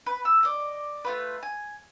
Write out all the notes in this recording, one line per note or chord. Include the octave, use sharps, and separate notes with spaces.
B4
E6
D5 D#5
A3 F4 B4
G#5